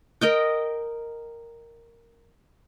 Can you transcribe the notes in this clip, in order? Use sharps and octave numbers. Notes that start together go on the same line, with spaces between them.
A#4 D#5 G5